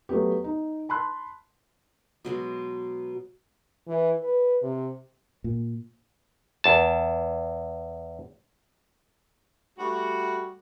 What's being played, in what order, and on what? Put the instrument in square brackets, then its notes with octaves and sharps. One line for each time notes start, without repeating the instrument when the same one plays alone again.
[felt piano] F#3 A3 B3 G4
D#4
A5 B5 C6 F#6
[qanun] B2 F#3 G#3 F#4
[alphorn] E3
B4
C3
[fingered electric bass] A#2
[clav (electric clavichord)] E2 A5
[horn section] G3 A3 F#4